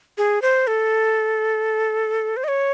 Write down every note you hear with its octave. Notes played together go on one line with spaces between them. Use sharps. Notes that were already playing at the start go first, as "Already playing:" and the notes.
G#4
C5
A4
C5
D#5
C#5